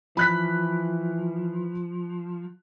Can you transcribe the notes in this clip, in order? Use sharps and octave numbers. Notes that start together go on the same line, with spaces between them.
E3 F3 B5 F#6 B6